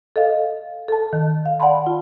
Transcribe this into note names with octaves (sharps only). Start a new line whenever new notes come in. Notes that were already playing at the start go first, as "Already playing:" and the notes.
A4 D#5 F5
A4 A5
D#3
F5
D5 F#5 G5 A5 B5 C6
F4